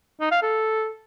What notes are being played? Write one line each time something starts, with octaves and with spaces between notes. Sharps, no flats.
D#4
F5
A4